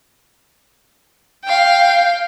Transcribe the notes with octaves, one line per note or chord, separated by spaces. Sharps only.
F5 G5